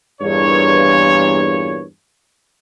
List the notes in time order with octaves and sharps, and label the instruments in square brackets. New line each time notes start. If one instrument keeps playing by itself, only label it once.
[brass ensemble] E2 G2 A#2 C#5